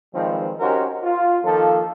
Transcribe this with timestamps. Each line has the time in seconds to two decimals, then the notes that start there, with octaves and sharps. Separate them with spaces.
0.15 D#3 F3 G3 G#3 C4 B4
0.60 C#4 D#4 F#4 G4 A#4 C5
1.04 F4
1.44 D#3 F3 A#3 A4